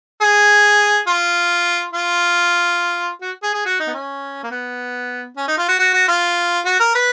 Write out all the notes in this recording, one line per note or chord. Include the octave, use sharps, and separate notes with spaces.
G#4
F4
F4
F#4
G#4
G#4
F#4
D#4
B3
C#4
A#3
B3
C#4
D#4
F4
F#4
F#4
F#4
F4
F#4
A#4
B4